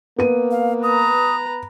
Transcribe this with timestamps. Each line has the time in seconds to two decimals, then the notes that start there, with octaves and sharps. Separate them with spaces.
0.18 A#3 B3 D#7
0.51 F5
0.83 B4 A#5 D#6